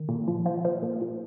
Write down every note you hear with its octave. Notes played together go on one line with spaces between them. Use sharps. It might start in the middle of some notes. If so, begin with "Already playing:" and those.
Already playing: D#3
A#2
F3
F3
F3
A#2
A#2